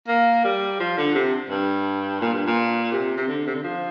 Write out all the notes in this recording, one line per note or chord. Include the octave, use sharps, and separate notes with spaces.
A#3
G3
F3
D3
C3
G2
A#2
G2
A#2
C3
C3
D3
C3
D3
F3